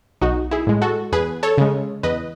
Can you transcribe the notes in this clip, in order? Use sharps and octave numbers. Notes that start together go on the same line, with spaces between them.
B1 D#4 F#4
E4 G#4
A2 G#3
F#4 A4
E2 G#4 B4
A4 C#5
C#3 G#3
E2 B4 D#5